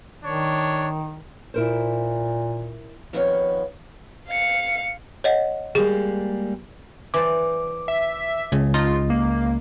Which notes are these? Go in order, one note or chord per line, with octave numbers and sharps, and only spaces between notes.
D#3 D4 C#5
A#2 E4 A#4 C5
F2 D#3 F3 B3 F4 C#5
F5 C#7
C#5 D#5 F#5
G3 G#3 A#3 G#4
E3 C5 D5 D6
E5
C#2 C#3
D#4 F4
A#3